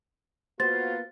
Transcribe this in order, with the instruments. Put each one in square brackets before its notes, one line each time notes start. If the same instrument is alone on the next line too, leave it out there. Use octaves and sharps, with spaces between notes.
[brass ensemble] A#3 B3 F4 [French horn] F#4 [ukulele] C5 [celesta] A6